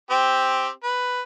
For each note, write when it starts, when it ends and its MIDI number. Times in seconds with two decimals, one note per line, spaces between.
0.10 0.69 60
0.10 0.69 67
0.84 1.21 71